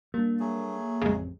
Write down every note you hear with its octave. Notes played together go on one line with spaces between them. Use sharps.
G3 A#3 D4
F#3 A3 G#4
A1 F2 C#3 G#3 C4